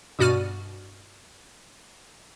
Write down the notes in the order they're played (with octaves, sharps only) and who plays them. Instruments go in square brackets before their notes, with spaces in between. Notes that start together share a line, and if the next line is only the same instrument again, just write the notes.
[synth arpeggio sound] G2 B2 F#4 D5 F6 D#7